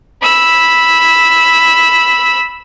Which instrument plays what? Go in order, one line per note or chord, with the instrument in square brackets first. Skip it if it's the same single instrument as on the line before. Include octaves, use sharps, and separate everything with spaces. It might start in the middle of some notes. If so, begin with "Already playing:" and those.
[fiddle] B5 E6